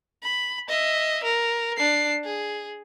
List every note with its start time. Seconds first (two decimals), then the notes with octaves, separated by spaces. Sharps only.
0.23 B5
0.68 D#5 E5
1.24 A#4
1.77 D4 C7
2.24 G#4